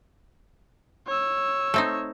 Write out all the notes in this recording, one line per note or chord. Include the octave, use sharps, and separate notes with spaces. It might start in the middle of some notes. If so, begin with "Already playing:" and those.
C#5 E6
A3 C4 D#4